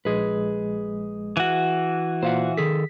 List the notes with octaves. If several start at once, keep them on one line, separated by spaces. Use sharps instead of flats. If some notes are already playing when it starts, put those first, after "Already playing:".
A#1 G#3 G#4 B4
E3 F#4
A#2 C5 F5 F#5
D#3 G#4 A4 B6